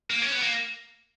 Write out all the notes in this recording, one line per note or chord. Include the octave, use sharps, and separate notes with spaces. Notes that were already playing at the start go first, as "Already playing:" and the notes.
A#3
C#4
B3
A#3